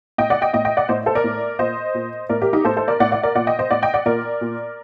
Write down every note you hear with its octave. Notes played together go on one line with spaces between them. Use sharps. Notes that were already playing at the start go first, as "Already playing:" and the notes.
A2 D#5 G5
D5 F#5
D#5 G5
A2 D#5 G5
D#5 G5
D5 F#5
A2 C5 D#5
A4 C5
A#4 D5
A2
A#2 C5 D#5
A#2
A2 A#4 D5
G4 A#4
D#4 G4
A2 A4 C5
A4 C5
A#4 D5
A2 D5 F#5
D5 F#5
A#4 D5
A#2 D5 F#5
D#5 G5
C5 D#5
A2 D5 F#5
D#5 G5
D5 F#5
A#2 A#4 D5
A#2